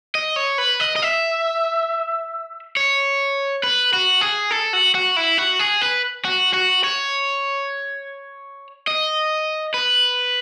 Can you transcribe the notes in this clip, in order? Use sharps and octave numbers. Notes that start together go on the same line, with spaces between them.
D#5
C#5
B4
D#5
D#5
E5
C#5
B4
F#4
G#4
A4
F#4
F#4
E4
F#4
G#4
B4
F#4
F#4
C#5
D#5
B4